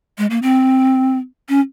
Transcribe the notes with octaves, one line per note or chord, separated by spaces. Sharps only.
G#3
A#3
C4
C#4